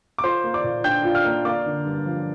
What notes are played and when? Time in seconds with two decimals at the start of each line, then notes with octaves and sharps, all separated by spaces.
0.18 D6
0.24 F4 C5 C6
0.44 A#3
0.54 D5 D6
0.64 A#2
0.84 D4 G5 G6
1.04 F4
1.15 F5 F6
1.25 A#3
1.45 A#3 D5 D6
1.66 D3
1.85 G2
2.06 F3